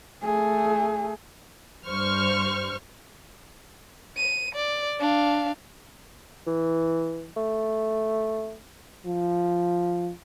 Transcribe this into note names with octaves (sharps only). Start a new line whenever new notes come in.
A3 G#4
G2 C5 C#6 F6
D#7
D5
D4 F5
E3
A3
F3